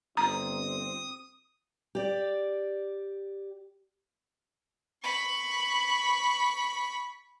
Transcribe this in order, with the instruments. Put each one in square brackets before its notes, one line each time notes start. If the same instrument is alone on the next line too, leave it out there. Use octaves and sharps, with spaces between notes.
[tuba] G1 [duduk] C4 [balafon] A#5 [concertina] D#6
[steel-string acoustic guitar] G4 D5
[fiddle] B5 C#6